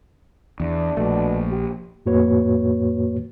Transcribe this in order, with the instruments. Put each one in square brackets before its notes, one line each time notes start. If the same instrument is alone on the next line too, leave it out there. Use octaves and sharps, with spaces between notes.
[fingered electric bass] E2 [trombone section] D4
[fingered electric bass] A#1 [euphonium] B2 [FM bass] A3
[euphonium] G4
[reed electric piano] F2 A2 A#3 F#4 B4 C#5